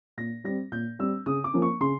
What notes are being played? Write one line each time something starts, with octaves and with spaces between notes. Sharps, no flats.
A#2 A#6
G3 C4 A#6
A#2 G6
G3 C4 E6
C#3 D#6
D6
F3 A#3 C#4
C#6
C#3 C6